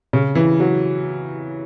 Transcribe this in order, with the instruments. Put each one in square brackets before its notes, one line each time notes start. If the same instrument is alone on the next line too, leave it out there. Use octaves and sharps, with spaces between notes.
[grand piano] C#3
E3
F#3